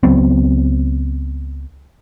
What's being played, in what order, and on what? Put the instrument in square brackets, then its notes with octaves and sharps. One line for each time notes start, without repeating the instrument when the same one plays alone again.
[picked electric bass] C#2 F#3 B3 C4